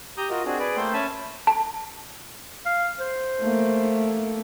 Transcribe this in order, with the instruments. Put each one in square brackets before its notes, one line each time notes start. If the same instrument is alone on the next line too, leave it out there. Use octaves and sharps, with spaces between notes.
[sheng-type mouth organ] G4 A#5 D#6 G6
F4 F#4 A#4 D#5
C4 D4 F#4 G#4
G#4 B4 D5
A3 A#3 A4 C5 G5 C6
C#4 E5 G#5 A5 B5
[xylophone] A5
[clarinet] F5
C5
[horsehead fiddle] A3 A#3